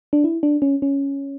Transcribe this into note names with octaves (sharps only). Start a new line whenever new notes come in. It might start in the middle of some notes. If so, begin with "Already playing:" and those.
D4
E4
D4
C#4
C#4